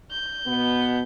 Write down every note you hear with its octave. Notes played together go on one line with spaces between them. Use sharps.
G6
B2 B3